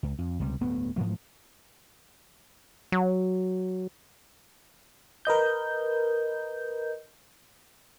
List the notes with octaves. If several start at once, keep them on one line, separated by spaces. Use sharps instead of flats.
C#2
F2
C#2 C3 G3
D1 G2 A3 B3
G#2 E3 F3 A3
F#3
A#4 B4 D#5 G6